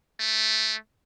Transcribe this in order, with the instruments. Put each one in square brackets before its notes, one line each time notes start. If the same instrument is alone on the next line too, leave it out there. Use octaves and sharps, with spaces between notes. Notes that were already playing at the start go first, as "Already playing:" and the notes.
[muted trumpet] A3